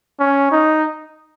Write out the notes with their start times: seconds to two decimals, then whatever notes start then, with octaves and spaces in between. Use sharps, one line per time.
0.20 C#4
0.52 D#4